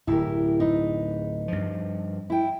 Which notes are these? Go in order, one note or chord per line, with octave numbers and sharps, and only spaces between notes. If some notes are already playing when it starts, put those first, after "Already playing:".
D1 E4 G4 A#4
D#4 B4
G2 F3
E4 G5